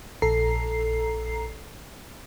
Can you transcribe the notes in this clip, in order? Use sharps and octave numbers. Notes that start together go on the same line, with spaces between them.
A#1 A4 A#5 C7